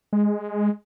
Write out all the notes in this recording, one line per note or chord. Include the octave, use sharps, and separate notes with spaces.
G#3